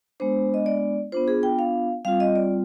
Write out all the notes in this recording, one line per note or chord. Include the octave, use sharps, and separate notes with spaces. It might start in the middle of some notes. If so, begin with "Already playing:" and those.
G#3 B3 D4 C5
D#5
D5
B3 D4 F4 C5
G#4
G5
F5
G3 C4 F4 F5
D#5
D5